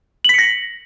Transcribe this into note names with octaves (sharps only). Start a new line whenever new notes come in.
A#6 B6 C#7 F#7